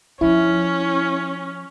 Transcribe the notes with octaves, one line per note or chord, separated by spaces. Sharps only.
F3 C#4 E4